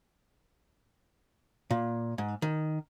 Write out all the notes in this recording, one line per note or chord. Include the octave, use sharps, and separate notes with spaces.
A#2
G#2
D#3